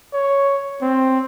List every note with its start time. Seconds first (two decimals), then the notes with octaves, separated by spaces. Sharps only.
0.13 C#5
0.81 C4